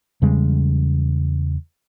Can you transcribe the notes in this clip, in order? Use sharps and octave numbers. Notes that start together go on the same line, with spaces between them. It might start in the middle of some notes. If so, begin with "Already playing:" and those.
E2 C#3 G3 G#3